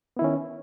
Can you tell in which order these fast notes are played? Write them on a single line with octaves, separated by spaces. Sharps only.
B3 E4 D#3 C#4